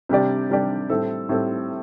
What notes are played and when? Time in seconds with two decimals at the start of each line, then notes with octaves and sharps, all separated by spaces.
0.09 C3 G3 D4 G4 D5
0.50 C3 G3 D4 G4 D5
0.90 A2 G3 C4 A4
1.29 A2 G3 C4 A4